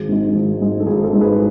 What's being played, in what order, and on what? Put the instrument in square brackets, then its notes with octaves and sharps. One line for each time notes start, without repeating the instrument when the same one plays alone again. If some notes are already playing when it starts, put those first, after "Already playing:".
Already playing: [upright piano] G#1 G#4
G#2 G#3
G#1
G#2 G#3
A4
G#1 G#4
A4
G#2 G#3
G#4 B4